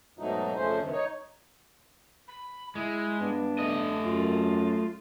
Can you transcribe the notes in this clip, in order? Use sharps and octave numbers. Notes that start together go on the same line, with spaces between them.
G#2 B2 F#3 A3 D#4
F2 C#3 A3 C#4 C5
G2 C3 D#3
D#4 C#5
B5
G#3 E4
G2 B3 D4
A3 D#5
F#2 F4